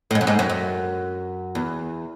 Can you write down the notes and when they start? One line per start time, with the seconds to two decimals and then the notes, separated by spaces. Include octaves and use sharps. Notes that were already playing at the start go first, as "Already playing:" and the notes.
0.11 A2
0.15 G#2
0.21 F#2
0.27 G#2
0.39 F#2
0.49 F#2
1.55 E2